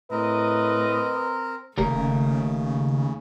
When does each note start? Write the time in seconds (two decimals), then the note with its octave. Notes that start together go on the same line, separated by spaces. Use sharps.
0.11 A2 C4 A#4 B4 D#5 A#5
1.78 F1 D#2 C#3 A3 A#4